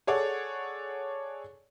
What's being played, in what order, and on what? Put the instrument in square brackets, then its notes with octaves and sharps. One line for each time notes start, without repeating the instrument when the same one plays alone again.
[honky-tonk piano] G#4 A4 C#5 D5 F#5